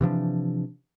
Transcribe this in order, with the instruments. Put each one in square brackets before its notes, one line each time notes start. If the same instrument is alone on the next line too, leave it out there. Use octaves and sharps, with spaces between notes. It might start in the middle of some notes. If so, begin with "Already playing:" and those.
[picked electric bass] C3 E3 F3 D4